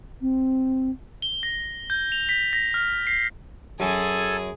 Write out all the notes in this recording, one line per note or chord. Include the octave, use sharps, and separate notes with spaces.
C4
G7
A#6
G6
F7
B6
A#6
F6
C7
F#2 G#4 A4 G#5